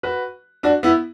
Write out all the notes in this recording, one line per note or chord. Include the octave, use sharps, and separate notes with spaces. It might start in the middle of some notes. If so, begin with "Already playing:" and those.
F#4 B4
D4 F#4
B3 E4